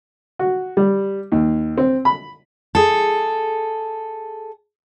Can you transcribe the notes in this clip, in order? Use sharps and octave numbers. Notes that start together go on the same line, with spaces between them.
F#4
G3
D#2
C4
B5
G#4 A4